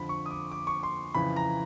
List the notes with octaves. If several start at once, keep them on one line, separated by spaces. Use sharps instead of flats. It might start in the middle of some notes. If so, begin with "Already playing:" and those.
Already playing: F2 D3 F3 B5
C#6
D#6
D6
D6
C#6
C6
F2 C#3 E3 B5
A#5